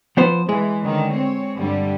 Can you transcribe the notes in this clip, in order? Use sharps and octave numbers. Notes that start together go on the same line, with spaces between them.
F3 B3 C5
E3 G#3
D3 D#3 C#4
C4 C#5
G2 D3 G3